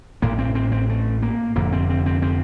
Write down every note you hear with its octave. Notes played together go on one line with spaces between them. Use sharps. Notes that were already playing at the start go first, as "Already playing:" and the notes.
A1 A2 A#3
C4
C4
C4
A3
A#3
F1 F2 D3 A#3
C4
C4
C4
C4